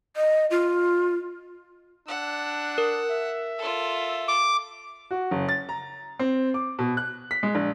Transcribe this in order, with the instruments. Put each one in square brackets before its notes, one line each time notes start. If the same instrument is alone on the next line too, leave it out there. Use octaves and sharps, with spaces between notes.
[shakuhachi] D#5
F4
[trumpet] D4 [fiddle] F#5 E6
[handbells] A#4
[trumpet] E5
[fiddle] F4 A4
[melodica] D6
[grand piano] F#4
F#1
A6
A#5
C4
D6
B2
F#6
B6
G#3
A#1